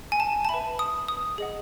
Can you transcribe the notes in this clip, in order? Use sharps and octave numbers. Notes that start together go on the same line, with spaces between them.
G#5
A5
A5
B4 E5 B5
D#6
D#6
G#4 D#5 F#5